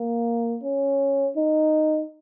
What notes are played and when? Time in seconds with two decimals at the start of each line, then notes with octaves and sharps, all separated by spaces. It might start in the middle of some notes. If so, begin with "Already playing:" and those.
Already playing: A#3
0.63 C#4
1.36 D#4